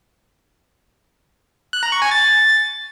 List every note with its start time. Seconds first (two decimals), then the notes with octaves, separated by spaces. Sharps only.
1.73 F#6
1.83 A#5
1.92 C#6
2.02 G#5
2.11 A6